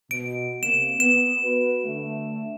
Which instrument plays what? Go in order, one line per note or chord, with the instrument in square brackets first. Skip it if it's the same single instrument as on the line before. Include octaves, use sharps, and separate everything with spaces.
[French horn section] B2 [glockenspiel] D7
[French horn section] C3 A#3 [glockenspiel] E7
[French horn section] B3 [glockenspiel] E7
[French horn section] F#4 B4
D3 A3